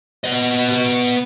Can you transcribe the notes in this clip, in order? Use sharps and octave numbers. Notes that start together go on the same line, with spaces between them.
B3 D#5